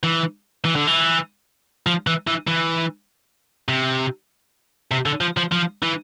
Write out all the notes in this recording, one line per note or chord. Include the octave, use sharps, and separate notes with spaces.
E3
E3
D3
E3
F3
E3
E3
E3
C3
C3
D3
F3
F3
F3
E3